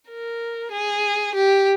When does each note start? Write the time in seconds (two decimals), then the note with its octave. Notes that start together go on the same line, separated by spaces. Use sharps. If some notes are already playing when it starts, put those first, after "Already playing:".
0.10 A#4
0.72 G#4
1.35 G4